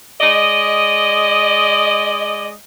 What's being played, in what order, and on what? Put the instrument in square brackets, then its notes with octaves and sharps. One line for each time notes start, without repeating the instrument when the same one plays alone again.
[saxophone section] G#3 D5 D#5